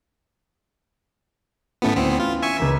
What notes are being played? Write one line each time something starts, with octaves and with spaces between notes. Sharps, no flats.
A2 E3 A3 B3 C#4 E4
D2 B3 C4
F4
E5 G#5 C#6
C#2 A#3 E5 B6